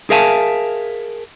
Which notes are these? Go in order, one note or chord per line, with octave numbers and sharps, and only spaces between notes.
G#4 A#4 E5 F5 G#5 A5